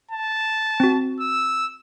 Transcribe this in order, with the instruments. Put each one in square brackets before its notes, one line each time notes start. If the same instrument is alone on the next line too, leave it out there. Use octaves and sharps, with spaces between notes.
[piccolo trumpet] A5
[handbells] C4 F#4
[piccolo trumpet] E6